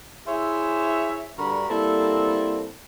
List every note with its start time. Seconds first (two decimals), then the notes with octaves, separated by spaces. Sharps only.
0.27 E4 G#4 C5 C#5 E5
1.38 G2 D3 F#4 A#4 B5
1.69 G3 A#3 C4 E4 A4